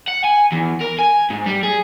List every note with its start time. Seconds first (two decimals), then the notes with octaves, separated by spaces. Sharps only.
0.08 F#5
0.24 G#5
0.52 E2
0.81 A#4
0.99 G#5
1.31 G#2
1.46 G3
1.63 G#4